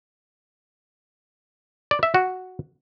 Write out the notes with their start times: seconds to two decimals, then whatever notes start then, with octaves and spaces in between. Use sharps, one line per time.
1.91 D5
2.03 E5
2.14 F#4